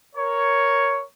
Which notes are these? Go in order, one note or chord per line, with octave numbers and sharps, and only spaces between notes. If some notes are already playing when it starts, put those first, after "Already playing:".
A#4 C#5